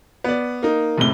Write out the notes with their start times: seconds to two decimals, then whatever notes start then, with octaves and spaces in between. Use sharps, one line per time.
0.24 B3 D5
0.63 A#3 D#4
0.98 F#1 A2 C3 G7